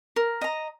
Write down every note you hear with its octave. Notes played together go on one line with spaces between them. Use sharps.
A#4
D#5 A#5